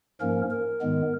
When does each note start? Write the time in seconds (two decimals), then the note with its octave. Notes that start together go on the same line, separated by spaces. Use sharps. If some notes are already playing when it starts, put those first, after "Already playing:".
0.21 G#2 F3 A#3 C#4 A#4
0.51 A#4
0.81 G#2 D#3 G#3 B3